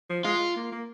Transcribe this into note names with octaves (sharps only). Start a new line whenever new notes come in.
F3
G#3 F4
A#3
A#3